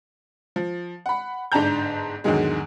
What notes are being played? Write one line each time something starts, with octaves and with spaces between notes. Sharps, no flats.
F3
F#5 B5
G1 G#2 D4 A5 A#5 G6
E2 G#2 D3 D#3 F#3 G#3